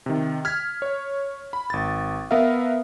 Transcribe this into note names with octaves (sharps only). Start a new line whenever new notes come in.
C3 D#3
F6 G#6 B6
C#5
B5
G#1 A6
B3 A#4 B4 E5 F5